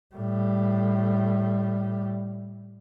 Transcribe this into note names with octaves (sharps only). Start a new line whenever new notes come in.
A2 G3